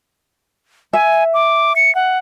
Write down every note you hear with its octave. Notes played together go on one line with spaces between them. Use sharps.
E5 G#5
D6
C#7
F#5